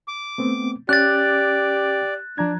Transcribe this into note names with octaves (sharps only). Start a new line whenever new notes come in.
D6
A3 B3 C4
C#4 G4 D5 F#6 A6
F3 D4 A#5 G#6